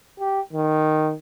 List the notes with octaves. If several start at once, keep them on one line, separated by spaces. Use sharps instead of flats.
G4
D#3